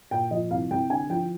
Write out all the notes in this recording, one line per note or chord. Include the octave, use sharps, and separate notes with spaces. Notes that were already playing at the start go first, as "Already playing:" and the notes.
A#2 G5
F3 D#5
C2 F5
C2 G5
D3 G#5
F3 G5